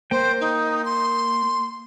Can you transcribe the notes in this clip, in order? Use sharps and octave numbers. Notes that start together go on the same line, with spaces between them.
A#3 C5 G5
D#4
C6